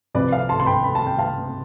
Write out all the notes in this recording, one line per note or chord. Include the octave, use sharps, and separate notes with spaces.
C2 C3 F3 B4 D5
D5 F5
A5 C6
C6
G5 B5
B5
A5
G5
F5 A5